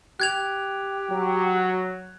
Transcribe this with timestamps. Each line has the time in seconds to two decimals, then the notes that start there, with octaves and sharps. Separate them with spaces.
0.20 G4 F#6 G#6 F7
1.11 F#3